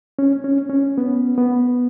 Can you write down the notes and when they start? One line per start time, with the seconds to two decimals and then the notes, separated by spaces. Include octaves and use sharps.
0.19 C#4
0.44 C#4
0.70 C#4
0.98 B3
1.38 B3